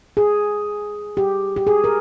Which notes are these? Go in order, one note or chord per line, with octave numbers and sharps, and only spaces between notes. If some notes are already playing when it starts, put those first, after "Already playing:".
G#4
G4
G4
G#4
A#4